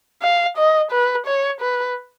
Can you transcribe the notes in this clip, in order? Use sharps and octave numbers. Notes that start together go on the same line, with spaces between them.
F5
D#5
B4
C#5
B4